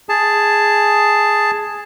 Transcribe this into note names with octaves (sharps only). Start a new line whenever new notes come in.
G#4 A5